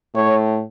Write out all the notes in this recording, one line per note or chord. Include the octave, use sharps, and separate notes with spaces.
A2 C#5